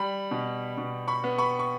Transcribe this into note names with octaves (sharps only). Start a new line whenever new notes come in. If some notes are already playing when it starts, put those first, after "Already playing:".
Already playing: G3 B5
B2
B2
B5 C#6
B3
B5 C#6
C#6